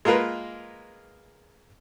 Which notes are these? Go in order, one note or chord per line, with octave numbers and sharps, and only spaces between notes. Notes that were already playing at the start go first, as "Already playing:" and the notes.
G#3 A#3 F4 A#4 B4